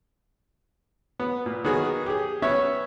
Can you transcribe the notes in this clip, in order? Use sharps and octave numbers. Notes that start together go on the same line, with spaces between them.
B3
A#2
D#3 B3 F#4 G#4
G4 G#4
B3 C#4 C#5 E5